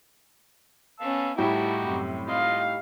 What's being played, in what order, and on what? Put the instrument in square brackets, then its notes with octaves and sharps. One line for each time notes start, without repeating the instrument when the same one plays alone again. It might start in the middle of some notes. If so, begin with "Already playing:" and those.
[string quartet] B3 C#4 [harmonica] F5 A5 E6
[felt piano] A2 G3 G5 [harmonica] D#4 F#4 G4 [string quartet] E4 A4
[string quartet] F#2 C3
[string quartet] D#4 F5 [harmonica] F4 D#5